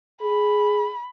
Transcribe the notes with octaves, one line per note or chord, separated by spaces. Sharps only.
G#4 B5